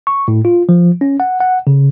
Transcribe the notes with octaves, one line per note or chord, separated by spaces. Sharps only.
C#6
A2
F4
F3
C#4
F#5
F#5
C#3